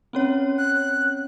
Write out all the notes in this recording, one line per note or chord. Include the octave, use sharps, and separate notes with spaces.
C4 C#4 C#5
F#6